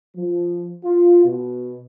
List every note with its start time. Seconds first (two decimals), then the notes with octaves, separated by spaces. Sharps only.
0.16 F3
0.84 F4
1.25 B2